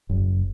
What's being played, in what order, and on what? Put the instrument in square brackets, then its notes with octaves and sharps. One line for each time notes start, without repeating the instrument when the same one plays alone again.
[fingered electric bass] F#1